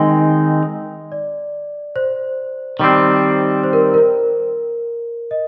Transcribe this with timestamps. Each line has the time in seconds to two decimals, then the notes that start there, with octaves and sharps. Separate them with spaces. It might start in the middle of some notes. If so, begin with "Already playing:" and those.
Already playing: D#3 G#3 C4 D#4 D#5
1.12 D5
1.96 C5
2.80 D#3 G3 C4
3.63 C5
3.73 A#4
3.94 A#4
5.31 D#5